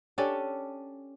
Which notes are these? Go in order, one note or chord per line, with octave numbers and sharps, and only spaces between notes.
C#4 D4 G4 A4